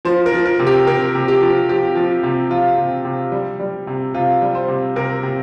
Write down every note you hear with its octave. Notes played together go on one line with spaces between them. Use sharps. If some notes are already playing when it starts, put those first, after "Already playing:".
F3 C5
A#4
F3
A#4
C3
G4
C3 A#4
C3
G4
F3
F3 G4
F3
C3
F3 F4
C3
C3
G3
G3
C3
C3 F4
G3
C5
C3
C3 A#4
C3